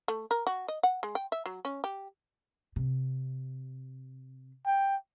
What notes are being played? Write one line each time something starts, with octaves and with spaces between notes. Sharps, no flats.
A3
A#4
F#4
D#5
F#5
G#3
G5
E5
F#3
C#4
G4
C3
G5